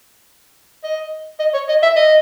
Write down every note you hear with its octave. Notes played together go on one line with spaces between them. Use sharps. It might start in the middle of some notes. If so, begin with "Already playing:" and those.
D#5
D#5
C#5
D#5
E5
D#5